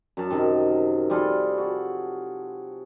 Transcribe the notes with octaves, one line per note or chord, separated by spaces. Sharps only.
F#2 A5
F#2 C3 D#3
G3 F4 G#4 A4
F#4